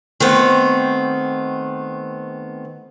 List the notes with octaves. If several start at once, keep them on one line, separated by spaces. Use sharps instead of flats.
D#3 A3 B3 C4